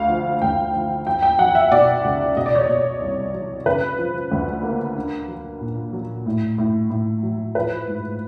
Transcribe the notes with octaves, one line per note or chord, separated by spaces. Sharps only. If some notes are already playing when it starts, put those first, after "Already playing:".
Already playing: D2 F5
F3
D2 G5
F3
F#3 G5
G5
F#3 F#5
E5
B2 D5
C#2
B2 D#5
D5
C#5
B2 D5
C2
F#3
C#3 B4
F3
D2
A#3
D4
F#3
A#2
F#3
A2
A2
A2
F#3
F3 B4
G#2